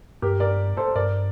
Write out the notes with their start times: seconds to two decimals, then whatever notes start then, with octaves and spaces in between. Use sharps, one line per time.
0.22 G2 G4 A#4
0.40 A#4 D5
0.77 A4 C5
0.95 G2 A#4 D5